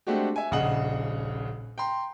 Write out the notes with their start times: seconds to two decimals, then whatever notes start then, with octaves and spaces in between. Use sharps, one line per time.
0.07 G#3 A3 C4 D4 F#4 G4
0.36 E5 G#5
0.51 D#1 A#1 C#3 D#5 F#5 F#7
1.78 G5 A#5 C6